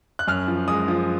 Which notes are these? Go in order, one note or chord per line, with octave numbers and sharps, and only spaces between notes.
F#6
F#2 F6
F3
G#3 D#6
F3